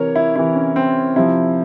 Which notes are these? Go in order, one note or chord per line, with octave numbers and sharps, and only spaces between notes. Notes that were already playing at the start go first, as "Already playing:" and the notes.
Already playing: C3 E3 A#4 C#5
E4
C3 E3 E4
C#4
C4
C3 F3 E4